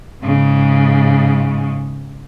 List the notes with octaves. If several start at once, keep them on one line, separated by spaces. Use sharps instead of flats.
G#2 C#3